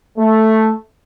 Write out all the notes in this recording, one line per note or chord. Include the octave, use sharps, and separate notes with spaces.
A3